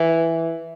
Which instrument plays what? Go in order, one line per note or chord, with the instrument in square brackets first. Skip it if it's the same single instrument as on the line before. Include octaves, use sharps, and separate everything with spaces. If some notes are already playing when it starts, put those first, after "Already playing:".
Already playing: [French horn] E3